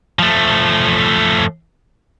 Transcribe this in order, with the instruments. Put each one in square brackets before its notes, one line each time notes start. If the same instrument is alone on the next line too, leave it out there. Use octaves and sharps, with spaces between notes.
[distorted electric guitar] F3 A3